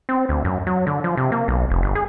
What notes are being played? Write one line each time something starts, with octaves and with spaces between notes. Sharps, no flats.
C4
D2
F#2
F#3
D3
F3
C3
A#3
B1
F1
G1
G#4